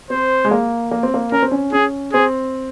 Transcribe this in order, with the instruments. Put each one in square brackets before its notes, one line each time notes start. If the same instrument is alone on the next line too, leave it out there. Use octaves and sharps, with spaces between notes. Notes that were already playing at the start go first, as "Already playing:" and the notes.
[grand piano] C4 [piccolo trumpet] C5
[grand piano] G#3
A#3
A#3
C4
A#3
[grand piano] C#4 [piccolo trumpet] A#4
[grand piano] C4
C#4
[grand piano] C#4 [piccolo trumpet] G#4
[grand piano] C4 [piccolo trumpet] G#4